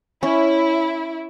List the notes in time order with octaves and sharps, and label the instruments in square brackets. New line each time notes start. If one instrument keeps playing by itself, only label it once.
[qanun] C#4 [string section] E4